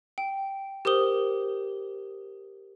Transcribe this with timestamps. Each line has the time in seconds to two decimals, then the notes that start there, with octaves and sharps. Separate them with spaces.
0.18 G5
0.85 G4 A#4 C5 D#6 G7